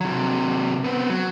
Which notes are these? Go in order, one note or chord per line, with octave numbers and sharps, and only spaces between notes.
C3 F#3
B3 C4
F#3